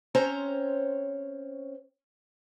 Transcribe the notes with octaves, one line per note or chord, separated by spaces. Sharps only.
C4 C#4 C5 C#5 A#5